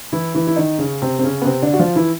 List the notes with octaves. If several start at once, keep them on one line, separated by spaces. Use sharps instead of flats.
E3 E4
E3 E4
E4
D#3 D#4
C#3 C#4
C3 C4
C4
C#3 C#4
B3
C3 C4
D3 D4
F#4
F3 F4
E3 E4